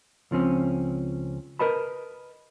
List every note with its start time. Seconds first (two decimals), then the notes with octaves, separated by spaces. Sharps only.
0.31 C#2 F3 C4 C#4
1.59 A#4 B4 D#5 A5 B5